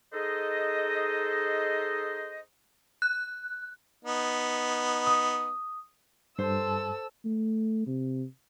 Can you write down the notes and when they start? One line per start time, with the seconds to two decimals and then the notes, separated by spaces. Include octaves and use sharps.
0.12 D#4 G#4 A4 C5 D#5
3.02 F#6
4.05 B3 D#4
5.07 D#6
6.39 G2 A4 C5 E6
7.25 A3
7.87 C3